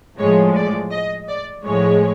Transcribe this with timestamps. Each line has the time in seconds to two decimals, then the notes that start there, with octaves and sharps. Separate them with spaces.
0.18 A2 F3 G#3 C#5
0.55 D5
0.91 D#5
1.28 D5
1.65 A2 F3 G#3 C#5